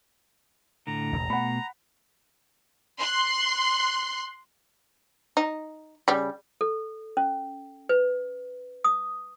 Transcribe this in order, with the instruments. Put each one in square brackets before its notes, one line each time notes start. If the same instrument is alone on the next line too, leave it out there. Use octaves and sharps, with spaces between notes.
[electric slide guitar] A2 D3 [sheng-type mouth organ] A#5
[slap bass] E1 A1 E2
[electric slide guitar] B2 [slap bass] A3 [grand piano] F#5 B5
[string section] C6 F#6
[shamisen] D#4
C#3 G3
[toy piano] A4
C#4
B4
D#6